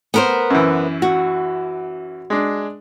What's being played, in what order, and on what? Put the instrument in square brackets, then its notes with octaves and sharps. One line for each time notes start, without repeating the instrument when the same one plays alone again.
[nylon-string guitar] B3 A#4 C5
[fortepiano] F#2 E3
[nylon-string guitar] F#4
[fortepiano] G#3 D4